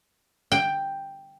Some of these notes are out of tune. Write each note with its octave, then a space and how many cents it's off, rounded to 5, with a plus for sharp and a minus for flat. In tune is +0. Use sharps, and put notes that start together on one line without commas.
G5 +5